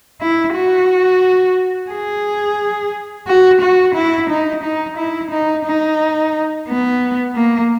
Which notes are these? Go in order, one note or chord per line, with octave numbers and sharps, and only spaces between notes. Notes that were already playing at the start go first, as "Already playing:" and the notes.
E4
F#4
G#4
F#4
F#4
E4
D#4
D#4
E4
D#4
D#4
B3
A#3